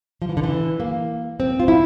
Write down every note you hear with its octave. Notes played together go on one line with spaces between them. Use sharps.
F3
E3
D3
E3
A#3
C4
F4
E4